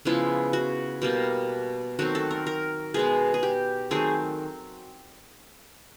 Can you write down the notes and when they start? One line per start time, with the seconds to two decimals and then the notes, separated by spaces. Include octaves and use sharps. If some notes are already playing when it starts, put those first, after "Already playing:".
0.05 C#3 F3 G#3 B3 E4
0.53 F#4
1.02 B2 G3 A#3
1.99 D#3 F#3 A3 C4 F#4
2.15 A4
2.31 A#4
2.47 A#4
2.94 B2 G#3 B3 G#4
3.34 G#4
3.43 G4
3.91 D#3 F#3 A3 C4 G#4